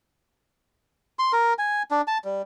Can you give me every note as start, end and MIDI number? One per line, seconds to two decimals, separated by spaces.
1.19 1.32 84
1.33 1.53 70
1.58 1.83 80
1.91 2.02 62
2.07 2.18 81
2.25 2.42 55